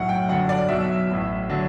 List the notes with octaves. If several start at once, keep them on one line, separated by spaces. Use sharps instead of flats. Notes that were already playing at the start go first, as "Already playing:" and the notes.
Already playing: B1 A2 F#3 F#5
G5
G1 G2 D3 F#3 F#5
D5
B1 B2 F#3 E5
A1 A2 F#3
D3 F#3